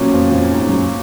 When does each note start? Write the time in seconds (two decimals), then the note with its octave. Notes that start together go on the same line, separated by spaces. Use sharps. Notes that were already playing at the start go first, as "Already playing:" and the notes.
Already playing: A#2 F#3 C#4
0.12 F2 F3
0.31 F2 F3
0.49 G#2 G#3
0.68 F#2 F#3